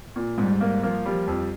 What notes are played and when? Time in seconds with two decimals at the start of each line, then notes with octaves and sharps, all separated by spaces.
0.16 A#2
0.38 G#2 G3
0.61 A#3
0.83 F3 A#3
1.06 G3
1.28 F2